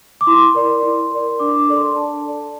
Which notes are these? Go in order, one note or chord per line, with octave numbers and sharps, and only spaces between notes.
D6
E4 C6
A#4 D5
E4
A#4 D5
D4 D6
D6
A4 D5
C6
D4 A5
A4 D5